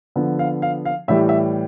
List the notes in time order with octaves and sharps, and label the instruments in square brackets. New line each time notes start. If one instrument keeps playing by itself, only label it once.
[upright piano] D3 F3 B3
F5
F5
F5
A2 E3 G3 E5
E5